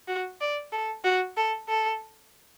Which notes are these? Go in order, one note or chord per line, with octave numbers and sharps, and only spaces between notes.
F#4
D5
A4
F#4
A4
A4